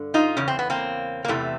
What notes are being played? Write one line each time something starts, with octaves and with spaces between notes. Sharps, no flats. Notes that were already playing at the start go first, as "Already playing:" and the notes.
Already playing: G2 D3
D#4 F4
E2 C#3 C#4
C4
B3
A#3 C4
A#3
E2 C3 E3 A3